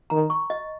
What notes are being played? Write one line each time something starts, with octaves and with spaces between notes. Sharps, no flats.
D#3 A#5
C#6
D#5